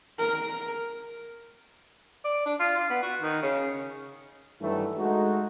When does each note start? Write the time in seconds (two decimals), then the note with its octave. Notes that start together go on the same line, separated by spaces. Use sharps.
0.19 A#4
2.25 D5
2.46 D4
2.59 F4
2.77 F4
2.90 B3
3.02 F#4
3.21 D#3
3.42 C#3
4.61 G2 D#3 E3 F#3 A3
4.98 G#3 A3 D#4 F#4